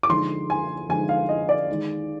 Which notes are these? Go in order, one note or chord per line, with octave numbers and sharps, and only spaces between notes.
D6
D3 F3 G#3 D#4 C6
G#5
D3 F3 G#3 D#4 G#5
F5
D#5
D5
D#3 G#3 D#4